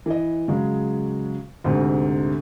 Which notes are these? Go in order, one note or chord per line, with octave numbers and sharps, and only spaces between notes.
E3 D#5
C#3 F#3 G#3
D2 G#2 C3